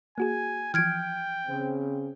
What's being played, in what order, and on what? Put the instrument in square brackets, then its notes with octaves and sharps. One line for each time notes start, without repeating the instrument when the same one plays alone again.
[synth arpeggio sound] A#3 F#4 G#4 [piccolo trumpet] G#5
[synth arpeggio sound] E3 F3 [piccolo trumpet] G5 [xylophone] F6 G#6 D7
[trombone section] C#3 C4